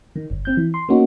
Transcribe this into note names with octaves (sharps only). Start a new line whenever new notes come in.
D#3
G1
C4 G6
E3
C6
A#3 B3 C#4 D#4 F#4